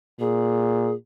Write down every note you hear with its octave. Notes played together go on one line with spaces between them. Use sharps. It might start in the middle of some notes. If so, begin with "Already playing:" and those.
A#2 G#4